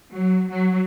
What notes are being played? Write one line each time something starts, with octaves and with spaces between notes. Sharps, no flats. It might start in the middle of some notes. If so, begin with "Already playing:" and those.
F#3
F#3